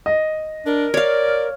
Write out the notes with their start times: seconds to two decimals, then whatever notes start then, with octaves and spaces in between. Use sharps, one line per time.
0.06 D#5
0.66 D4 A#4
0.94 C#5 D5 F5